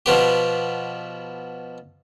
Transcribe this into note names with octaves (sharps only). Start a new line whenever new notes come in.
B2 F3 B3 G4